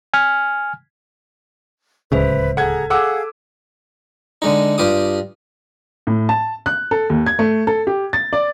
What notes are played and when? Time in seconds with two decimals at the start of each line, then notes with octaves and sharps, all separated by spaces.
0.14 G#5 F6
2.12 D1 C#2 C#3 B4 C5 E5
2.57 G#4 A4 F#5 A#5 G#6
2.90 G#4 A4 F5 F#5 D6 E6
4.42 D3 G#3 D#4
4.78 G2 F4 G4 D6 D#6
6.07 A2
6.29 A5
6.66 F#6
6.91 A4
7.10 D#2
7.26 G#6
7.39 A3
7.67 A4
7.87 G4
8.13 A6
8.33 D5